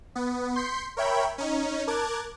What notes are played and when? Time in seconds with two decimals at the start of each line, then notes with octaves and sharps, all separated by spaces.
0.15 B3
0.56 C6 G6 B6 C#7
0.97 A#4 C#5 E5 G5 B5
1.38 C#4 D#4
1.87 A#4 A5 D6 F#6 G#6